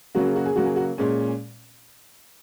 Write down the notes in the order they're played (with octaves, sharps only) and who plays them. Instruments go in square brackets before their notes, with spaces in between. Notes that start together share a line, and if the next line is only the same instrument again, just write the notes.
[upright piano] C#3 F#3 A#3 F#4
G#4
F#4
G#4
C#3 F#3 A#3 F#4
G#4
F#4
A#2 G#3 C#4 G#4